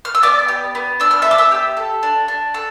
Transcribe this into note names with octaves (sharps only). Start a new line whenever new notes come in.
F6
E6
B3 D5 D6
G4
B3
D4 E6
F6
B3 E5 D6 E6
E5 E6
G4
A4
D4
D4
A4